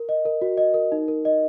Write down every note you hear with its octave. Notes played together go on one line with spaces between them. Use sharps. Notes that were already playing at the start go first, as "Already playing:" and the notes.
Already playing: A#4
D#5
A#4
F#4
D#5
A#4
D#4
A#4
D#5